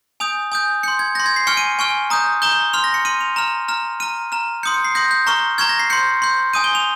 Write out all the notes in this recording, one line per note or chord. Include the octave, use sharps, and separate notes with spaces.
G#5 D#6 G6 F7
G#5 D#6 G6
C6 G6 C#7
G#6
C6 G6 A#6
G#6
C7
G#5 C#6 F6 C#7
D#7
G#5 C#6 F6
A#5 D#6 G6
A#5 D#6 G6 G7
C6 F6 F7
A#6
C#7
C6 F6 D#7
F7
A#5 F6 F7
A#5 F6
A#5 F6 D#7
A#5 F6
C6 D#6 G6 C#7
C#7
C7
C6 D#6 G6 A#6
G6
A#5 C#6 F6
A#5 C#6 F6 G#6
A#6
C7
C6 G6 C#7
C6 G6
G#5 D#6 G6 D#7
G7
F7